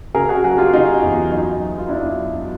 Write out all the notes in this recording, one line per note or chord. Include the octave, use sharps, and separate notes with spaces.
C#3 G#4 A#4
F#4 G#4
F#3 F#4 G#4
F4 G4
C#3 D#4 F4
E2
F#2 D#4
F#2
F4
F#2 D4 E4
F#2